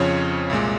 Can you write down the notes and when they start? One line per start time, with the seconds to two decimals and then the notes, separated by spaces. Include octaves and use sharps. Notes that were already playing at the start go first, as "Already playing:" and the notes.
Already playing: F2 C#3 F3 C#5
0.50 C2 A#2 G#3